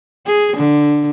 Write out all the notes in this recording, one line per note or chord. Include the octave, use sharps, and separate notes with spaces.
G#4
D3